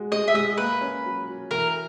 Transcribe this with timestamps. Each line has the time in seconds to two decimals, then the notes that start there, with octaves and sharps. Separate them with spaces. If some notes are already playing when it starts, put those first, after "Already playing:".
Already playing: G#3 F#4
0.12 G#3 D#5
0.28 E5
0.34 G#3 D#5
0.58 A#3 B4
0.81 C#4
1.05 F#3
1.28 F#3
1.51 E3 A#4